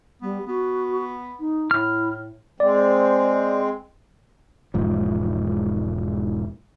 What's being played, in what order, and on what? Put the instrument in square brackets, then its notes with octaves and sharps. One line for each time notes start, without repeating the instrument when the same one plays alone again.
[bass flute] G3 [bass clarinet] B3
[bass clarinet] B3 [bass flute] F#4
[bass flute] D#4
[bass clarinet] A2 [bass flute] E4 [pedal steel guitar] F6
[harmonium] G#3 C4 [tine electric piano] D5
[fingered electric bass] E1 G#2 F3